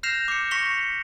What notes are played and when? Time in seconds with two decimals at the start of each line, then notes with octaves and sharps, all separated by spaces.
0.03 F6 G6 A#6 C7 E7 F7
0.28 D6 C#7
0.51 C#6 A#6 B6 C#7 F7 G7